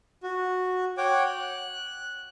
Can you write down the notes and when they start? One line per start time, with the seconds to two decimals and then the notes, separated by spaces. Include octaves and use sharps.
0.23 F#4
0.97 C#5 F#5 G5 D6
1.25 F#6